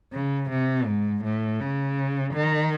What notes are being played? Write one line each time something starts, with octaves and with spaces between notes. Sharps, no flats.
C#3
C3
G#2
A2
C#3
D#3